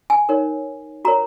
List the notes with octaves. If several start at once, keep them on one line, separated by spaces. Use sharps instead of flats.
G#5
D#4 A#4 C#5
F#4 A#4 C#5 A#5